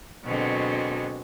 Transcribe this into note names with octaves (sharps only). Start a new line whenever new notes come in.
B2 D3 F#3 G#3 C4